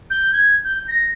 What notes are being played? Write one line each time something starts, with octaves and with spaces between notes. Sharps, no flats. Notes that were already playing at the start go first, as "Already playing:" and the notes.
G6
G#6
G6
A#6